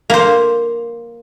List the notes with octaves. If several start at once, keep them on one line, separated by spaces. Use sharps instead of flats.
A#3 C5